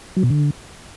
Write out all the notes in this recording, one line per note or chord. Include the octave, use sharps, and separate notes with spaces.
F#3
B2
D3